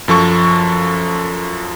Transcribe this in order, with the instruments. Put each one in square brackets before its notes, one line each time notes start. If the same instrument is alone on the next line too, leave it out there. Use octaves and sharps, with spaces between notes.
[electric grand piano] F#2 F3 A4 C#6